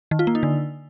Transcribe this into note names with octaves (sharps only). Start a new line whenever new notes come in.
D#3
F4
A#3
D#4
D3